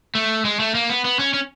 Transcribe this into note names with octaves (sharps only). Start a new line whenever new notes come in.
A3
G#3
A3
A#3
B3
B3
C#4
C#4